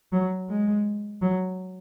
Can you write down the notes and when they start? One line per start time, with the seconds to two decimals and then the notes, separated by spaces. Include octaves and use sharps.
0.12 F#3
0.50 G#3
1.22 F#3